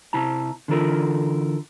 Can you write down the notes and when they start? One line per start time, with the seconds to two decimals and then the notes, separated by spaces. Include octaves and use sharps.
0.13 C3 E4 A5 A#5
0.68 D3 E3 F4 A4 A#4